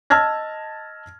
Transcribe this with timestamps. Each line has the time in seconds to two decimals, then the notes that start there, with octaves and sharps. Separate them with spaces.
0.10 D#5 A5 E6 F6 G#6 A#6